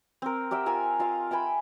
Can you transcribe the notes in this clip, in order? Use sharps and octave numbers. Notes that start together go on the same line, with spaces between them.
C4 A#4
G4 A#4 E5 F#5
F4 A#4 E5 G#5
F4 D#5 F5
E5 G5 G#5 B5